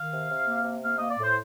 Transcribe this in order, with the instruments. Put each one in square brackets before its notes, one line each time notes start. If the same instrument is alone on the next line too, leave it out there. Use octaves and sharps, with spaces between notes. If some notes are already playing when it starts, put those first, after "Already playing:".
Already playing: [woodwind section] D#3 F5
C3
C3
A#3
C3
A#3 F5
A#3 D#5
D5
A2 C5